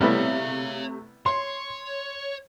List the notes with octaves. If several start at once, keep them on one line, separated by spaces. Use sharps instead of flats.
C3 G3 A3 B3 E4 C#5 F5
C#5 C6